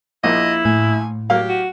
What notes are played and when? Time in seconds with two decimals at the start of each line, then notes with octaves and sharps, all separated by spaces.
0.24 A#1 A#3 E4 D#5
0.65 A2 G#5
1.30 F#3 A#3 G4 F5
1.48 F#4